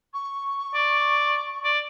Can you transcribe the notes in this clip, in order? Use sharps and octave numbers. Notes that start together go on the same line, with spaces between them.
C#6
D5
D5